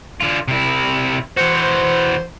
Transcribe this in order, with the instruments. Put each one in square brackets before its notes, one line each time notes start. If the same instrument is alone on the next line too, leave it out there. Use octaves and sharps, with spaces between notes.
[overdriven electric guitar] D3 F4
C3 E4
[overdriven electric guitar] E3 F#4 [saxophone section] C5